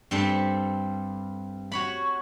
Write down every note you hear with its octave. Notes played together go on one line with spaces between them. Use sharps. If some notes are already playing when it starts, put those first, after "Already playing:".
G2 G3 C4 A4
F#4 C#5 B5